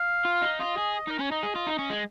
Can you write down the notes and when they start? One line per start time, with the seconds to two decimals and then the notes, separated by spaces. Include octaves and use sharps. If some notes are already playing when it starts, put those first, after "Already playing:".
Already playing: F5
0.25 F4
0.43 D#4
0.60 F4 D#5
0.78 G#4
1.08 D#4 A#4
1.19 C#4 C#5
1.31 D#4 D#5
1.43 G#4
1.55 F4
1.67 D#4
1.79 C#4
1.90 G#3